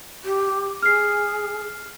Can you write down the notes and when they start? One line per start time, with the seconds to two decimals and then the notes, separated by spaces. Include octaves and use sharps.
0.25 G4
0.82 G#4 F6 C7